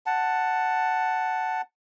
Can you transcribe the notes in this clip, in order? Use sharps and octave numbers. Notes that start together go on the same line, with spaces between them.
F#5 A5